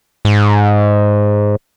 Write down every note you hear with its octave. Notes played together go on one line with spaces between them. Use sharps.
G#2